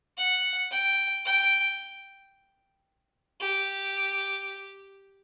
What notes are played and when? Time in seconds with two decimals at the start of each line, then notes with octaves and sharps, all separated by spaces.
0.17 F#5
0.71 G5
1.25 G5
3.40 G4